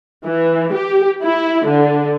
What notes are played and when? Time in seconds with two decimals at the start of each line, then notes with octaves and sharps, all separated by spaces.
0.25 E3
0.74 G4
1.22 E4
1.67 D3